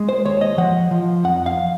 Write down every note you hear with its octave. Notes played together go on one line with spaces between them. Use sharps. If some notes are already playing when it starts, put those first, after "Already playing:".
Already playing: G#3
C5
D#2 C#5
D#5
F3 F#5
F3
F2 F#5
F5